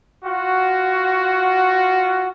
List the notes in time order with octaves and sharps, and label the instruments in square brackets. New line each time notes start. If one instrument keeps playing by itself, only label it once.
[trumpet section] F4 F#4